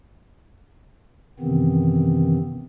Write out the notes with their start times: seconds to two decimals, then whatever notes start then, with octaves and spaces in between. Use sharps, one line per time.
1.39 F#2 C3 D#3 E3 B3 C4